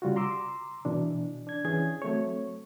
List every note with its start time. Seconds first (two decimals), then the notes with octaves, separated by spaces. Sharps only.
0.02 C#3 G3 F4 F#4
0.16 A#5 C6 D6 E6
0.85 B2 E3 D4
1.47 D4 G#6
1.65 E3 C#4 G#4 G#6
2.02 F#3 A3 C4 C#5